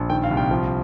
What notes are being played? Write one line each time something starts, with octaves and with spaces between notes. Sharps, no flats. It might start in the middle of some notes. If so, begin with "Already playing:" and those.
Already playing: A#1
D#3 G5
F5
C2
G5
F3